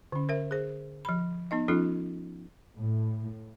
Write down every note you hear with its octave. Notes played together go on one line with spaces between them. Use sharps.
D3 C#4
A#4 C5 E5
G#4 C5
F3 B5
B3 D#4 D#5
F3 C#4 D#4 F4 A4
A2